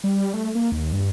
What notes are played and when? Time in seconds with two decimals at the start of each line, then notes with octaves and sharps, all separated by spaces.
0.04 G3
0.34 A3
0.55 A#3
0.72 D#2
0.93 G2